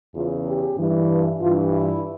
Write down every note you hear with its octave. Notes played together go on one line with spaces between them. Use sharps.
E2 C#3 E3 F4
G4
G2 E3
G2 E3 F4
E4